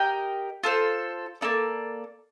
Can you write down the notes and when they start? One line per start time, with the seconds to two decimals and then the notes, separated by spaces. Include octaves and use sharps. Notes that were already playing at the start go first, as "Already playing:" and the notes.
Already playing: G4 A#4 D#5 G5
0.63 F4 A4 C5
1.41 A#3 D#4 A4 D5